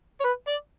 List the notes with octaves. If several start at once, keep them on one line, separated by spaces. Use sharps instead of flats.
C#5
B4
D5